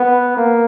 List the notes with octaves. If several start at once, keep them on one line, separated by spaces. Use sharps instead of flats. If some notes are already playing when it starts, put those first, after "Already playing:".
Already playing: B3
A#3